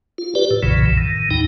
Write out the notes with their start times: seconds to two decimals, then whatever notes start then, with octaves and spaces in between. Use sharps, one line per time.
0.18 F4
0.35 G4 B4 D5
0.51 A2
0.63 B1 F#2 A#2 C#3 E3
0.98 A2 D#3
1.31 E2 D#4 G5